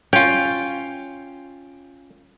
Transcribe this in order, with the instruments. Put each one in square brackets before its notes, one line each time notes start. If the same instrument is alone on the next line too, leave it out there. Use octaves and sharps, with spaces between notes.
[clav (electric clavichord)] C#4 F4 [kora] G5